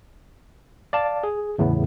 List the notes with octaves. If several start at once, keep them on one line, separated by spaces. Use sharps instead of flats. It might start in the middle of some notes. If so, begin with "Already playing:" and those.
D5 F5 A5
G#4
E2 A2 C#3 B3